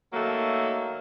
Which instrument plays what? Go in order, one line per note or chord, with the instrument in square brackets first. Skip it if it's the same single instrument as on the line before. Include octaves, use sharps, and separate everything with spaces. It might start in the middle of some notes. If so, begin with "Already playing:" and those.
[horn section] D#3 F#3 A3 A#3